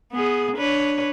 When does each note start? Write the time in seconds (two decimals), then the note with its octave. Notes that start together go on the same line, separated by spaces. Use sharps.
0.12 B3 G#4
0.56 D4 B4 C#5